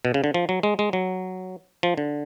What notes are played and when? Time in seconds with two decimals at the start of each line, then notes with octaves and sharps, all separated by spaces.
0.05 B2
0.14 C#3
0.24 D3
0.34 F3
0.49 F#3
0.63 G#3
0.79 G#3
0.93 F#3
1.83 F3
1.97 D3